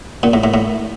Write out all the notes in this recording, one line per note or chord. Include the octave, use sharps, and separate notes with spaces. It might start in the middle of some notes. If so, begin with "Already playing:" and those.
A#2
A2
A2
A2